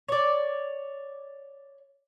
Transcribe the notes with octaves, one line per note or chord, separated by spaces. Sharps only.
C#5 D5